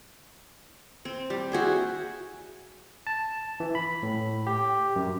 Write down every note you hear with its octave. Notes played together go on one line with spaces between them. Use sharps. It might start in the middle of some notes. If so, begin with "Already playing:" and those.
C4
G3
E4 F#4 G#4 C5
A5
E3
B5
A2
G4
F#2